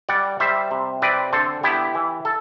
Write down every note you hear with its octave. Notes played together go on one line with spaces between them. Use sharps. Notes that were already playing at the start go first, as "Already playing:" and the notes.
G3 D5 F#5
G3 C5 E5
C3
C4 B4 D5
D3 A4 C5
B3 E4 G4
E3
A4